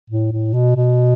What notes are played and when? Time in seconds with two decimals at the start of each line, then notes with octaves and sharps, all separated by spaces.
0.10 A2
0.32 A2
0.54 B2
0.76 B2